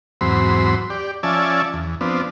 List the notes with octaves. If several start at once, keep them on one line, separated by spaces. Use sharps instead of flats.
E2 G#2 F#3 C4 B5 C6
G4 D5
F3 C#4 D5 E5 G#5 A5
E2
F3 B3 C4 D4